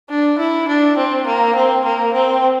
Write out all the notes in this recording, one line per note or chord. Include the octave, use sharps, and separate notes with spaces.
D4
E4
D4
C4
A#3
C4
A#3
C4